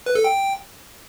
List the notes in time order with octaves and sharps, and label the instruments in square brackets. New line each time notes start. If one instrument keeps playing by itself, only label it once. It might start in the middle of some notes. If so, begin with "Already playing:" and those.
[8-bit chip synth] B4
A4
G5